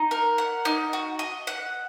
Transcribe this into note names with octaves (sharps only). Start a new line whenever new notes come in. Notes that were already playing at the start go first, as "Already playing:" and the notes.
Already playing: D#4
A#4
F#5
D#4
F#4
D#5
F#5